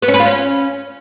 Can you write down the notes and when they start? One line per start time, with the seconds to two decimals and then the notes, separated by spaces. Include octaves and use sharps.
0.02 B3
0.08 C#4
0.14 B4
0.20 F4
0.25 C#4